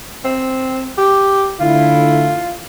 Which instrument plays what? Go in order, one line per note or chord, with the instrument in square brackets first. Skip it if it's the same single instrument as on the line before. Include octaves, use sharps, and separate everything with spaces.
[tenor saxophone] C4
G4
[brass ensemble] D3 A3 E4 [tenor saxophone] F4